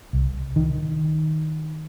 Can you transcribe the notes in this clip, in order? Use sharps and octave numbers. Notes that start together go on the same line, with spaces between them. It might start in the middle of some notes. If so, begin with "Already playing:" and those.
C2
D#3